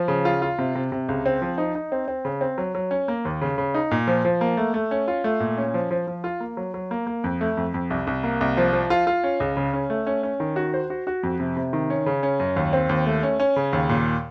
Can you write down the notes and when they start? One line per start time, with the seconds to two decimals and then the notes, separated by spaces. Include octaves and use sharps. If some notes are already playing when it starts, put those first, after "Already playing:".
Already playing: F3
0.08 C#3
0.25 F4
0.42 F4
0.58 C3
0.75 C3
0.92 C3
1.09 C#2
1.26 C4
1.42 F3
1.58 D#4
1.75 D#4
1.92 C4
2.08 C4
2.25 C#3
2.41 C4
2.58 F#3
2.75 F#3
2.91 C#4
3.08 A#3
3.25 D#2
3.42 C#3
3.58 C#3
3.74 D#4
3.91 A#2
4.07 F3
4.25 F3
4.41 A#3
4.57 A3
4.74 A3
4.91 C#4
5.08 F4
5.24 A3
5.40 A#2
5.58 C#4
5.74 F3
5.91 F3
6.07 F3
6.24 F4
6.40 A#3
6.57 F#3
6.74 F#3
6.91 A#3
7.07 A#3
7.24 F2
7.41 A3
7.57 F2
7.74 F2
7.90 C2
8.07 C2
8.24 A#3
8.41 C2
8.57 F3
8.73 F3
8.90 F4
9.07 F4
9.24 C#4
9.40 C#2
9.57 C#3
9.73 C#4
9.90 A3
10.07 C#4
10.23 C#4
10.40 D#3
10.56 F#4
10.74 C5
10.90 F#4
11.07 F#4
11.23 F2
11.40 C3
11.57 C3
11.73 D#3
11.90 C#4
12.06 C#3
12.23 C#4
12.40 F#2
12.56 D#2
12.73 C4
12.89 D#2
13.06 A3
13.23 C#4
13.40 C#4
13.56 C#3
13.73 D#2
13.89 A#2